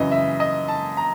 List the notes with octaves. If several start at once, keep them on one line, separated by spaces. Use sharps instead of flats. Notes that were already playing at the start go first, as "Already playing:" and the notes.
Already playing: F#2 C#3 E3 D#5
E5
D#5
A5
A#5